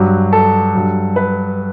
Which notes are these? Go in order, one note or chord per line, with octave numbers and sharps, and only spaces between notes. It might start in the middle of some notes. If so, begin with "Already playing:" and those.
Already playing: G2 F#3
A4
G2 F#3
B4